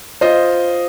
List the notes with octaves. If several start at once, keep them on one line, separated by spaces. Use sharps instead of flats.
F4 C5 D#5